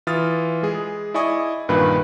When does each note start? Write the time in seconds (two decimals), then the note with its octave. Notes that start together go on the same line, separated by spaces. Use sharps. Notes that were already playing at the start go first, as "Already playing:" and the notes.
0.07 E3 F4 D#6 F6 A6
0.63 G#3 G#4
1.14 E4 D5 D#5 G#5 C#6 D#6
1.68 C2 G2 A#2 D#3 B4 B5